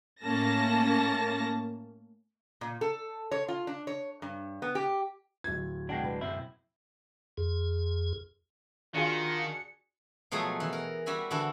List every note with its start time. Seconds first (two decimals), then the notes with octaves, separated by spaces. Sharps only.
0.24 A2 A#3 C#4 A5 A#6
2.61 A#2
2.81 A4
3.31 C#5
3.48 F4
3.67 D4
3.87 C#5
4.22 G2
4.62 B3
4.75 G4
5.44 D1 G#6
5.89 B2 G#3 D4 F#5 G5
6.04 B4
6.21 B1 F#2 C4 E4
7.37 F2 G#4
8.95 D#3 D4 F4 F#4 G#4 C#7
10.31 B2 F3 F#3 A3 G#4
10.60 E3
10.73 A#4
11.06 G3 F#4 E5 G#5 B5
11.31 D3 E3 E4 F#4 A4